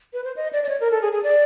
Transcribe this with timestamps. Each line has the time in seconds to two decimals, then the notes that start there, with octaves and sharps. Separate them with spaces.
0.13 B4
0.24 C5
0.36 D#5
0.53 D5
0.63 D5
0.69 C#5
0.80 A#4
0.91 A4
1.01 G#4
1.12 G#4
1.23 D5